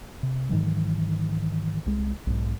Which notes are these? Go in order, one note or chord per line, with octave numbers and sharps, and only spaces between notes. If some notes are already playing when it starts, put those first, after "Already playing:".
C3
G#2 D#3 E3 F#3
C2 G#3
B1 G#2